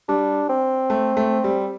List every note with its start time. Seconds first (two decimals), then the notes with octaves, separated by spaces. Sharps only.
0.09 G3 D4
0.49 C4
0.90 A3
1.17 A3
1.44 G3